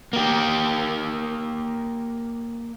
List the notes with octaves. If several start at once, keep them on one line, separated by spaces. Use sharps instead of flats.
A#3 G4